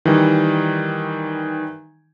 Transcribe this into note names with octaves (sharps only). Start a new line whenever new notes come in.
D#3 E3 G3